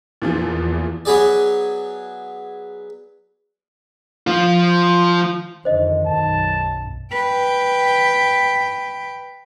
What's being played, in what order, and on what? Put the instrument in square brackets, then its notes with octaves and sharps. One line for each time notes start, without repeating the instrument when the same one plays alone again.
[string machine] E2 [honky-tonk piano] A#2 E3 F3
[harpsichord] F#3 B3 G#4 D5
[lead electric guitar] F3 F4
[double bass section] F2 D3 D#3 [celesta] C5 D#5
[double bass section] B1 F#2 [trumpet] A5
[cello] B4 G5